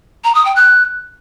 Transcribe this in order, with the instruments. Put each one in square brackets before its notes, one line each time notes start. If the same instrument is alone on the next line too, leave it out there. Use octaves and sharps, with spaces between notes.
[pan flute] A#5
D#6
G5
F#6